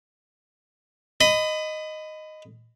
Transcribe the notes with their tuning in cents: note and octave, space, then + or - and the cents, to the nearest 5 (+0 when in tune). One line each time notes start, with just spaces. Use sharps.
D#5 -5 B5 +30